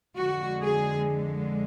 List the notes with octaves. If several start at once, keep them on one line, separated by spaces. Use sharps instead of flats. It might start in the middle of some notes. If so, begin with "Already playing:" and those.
F2 D3 G#3 F#4
G#4